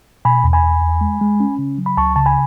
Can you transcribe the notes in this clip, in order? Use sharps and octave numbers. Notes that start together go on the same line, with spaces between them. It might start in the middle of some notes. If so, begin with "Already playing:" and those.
B2 G#5 B5
E2
G#5 B5
E2
E2
G#3
G#3
C#4
C#3
F#3
B5
C#2 A5 C#6
C#3 A5
G#5 B5